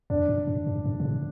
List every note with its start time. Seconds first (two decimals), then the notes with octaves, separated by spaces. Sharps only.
0.10 E2 D4
0.28 G2
0.47 G2
0.67 G2
0.85 G2
1.00 B2
1.05 A2